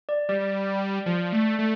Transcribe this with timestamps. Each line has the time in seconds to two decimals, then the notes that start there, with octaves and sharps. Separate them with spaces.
0.09 D5
0.29 G3 D5
1.06 F3
1.32 A3
1.59 A3